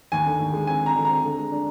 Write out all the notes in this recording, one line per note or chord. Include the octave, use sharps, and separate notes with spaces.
D#2 G#5
D3
D#2
G#3
C4 G#5
C4 A#5
D3
C4 A#5
D3
G#3
D4